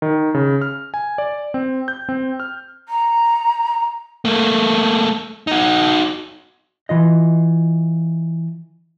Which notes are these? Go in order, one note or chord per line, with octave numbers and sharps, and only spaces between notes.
D#3
C#3
F6
G#5
D5
C4
G6
C4
F6
A#5
A3 A#3
D#4 F#4
E3 F4 D#5